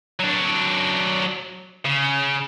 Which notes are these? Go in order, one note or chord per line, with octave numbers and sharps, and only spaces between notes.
F#3 D4
C#3